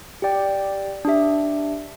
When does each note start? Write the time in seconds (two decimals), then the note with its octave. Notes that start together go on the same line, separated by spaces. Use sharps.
0.22 G4 D5 G5
1.05 D4 G4 E5